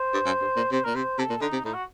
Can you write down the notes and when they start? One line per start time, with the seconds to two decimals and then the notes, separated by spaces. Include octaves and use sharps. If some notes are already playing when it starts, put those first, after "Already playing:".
Already playing: C5
0.14 G2
0.26 F#2
0.41 G2
0.56 A#2
0.72 C3 C5
0.84 A#2 A#4
0.95 C3 C5
1.18 C3 A4
1.30 A#2
1.41 D3 D#4
1.53 C3
1.65 A2 D#4
1.74 F#4